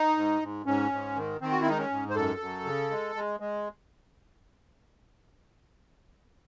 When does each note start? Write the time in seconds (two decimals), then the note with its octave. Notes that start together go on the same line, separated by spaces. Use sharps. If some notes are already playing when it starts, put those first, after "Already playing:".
Already playing: D#4
0.17 G#2
0.42 G#2
0.66 G#2 C#4
0.92 G#2
1.16 D#3
1.41 D#3 C4
1.52 F#4
1.61 E4
1.66 G#2 D#4
1.78 C#4
1.91 G#2
2.10 C5
2.15 F#2 A4
2.40 F#2
2.65 C#3
2.91 G#3
3.15 G#3
3.40 G#3